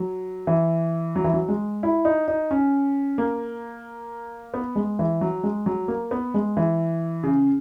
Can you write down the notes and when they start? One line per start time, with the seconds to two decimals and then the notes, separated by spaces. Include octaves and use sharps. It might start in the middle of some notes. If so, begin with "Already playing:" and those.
Already playing: F#3
0.47 E3
1.16 F#3
1.24 E3
1.33 F#3
1.48 G#3
1.83 E4
2.05 D#4
2.28 D#4
2.51 C#4
3.18 A#3
4.54 B3
4.76 G#3
4.99 E3
5.21 F#3
5.43 G#3
5.66 F#3
5.88 A#3
6.11 B3
6.34 G#3
6.57 E3
7.23 C#3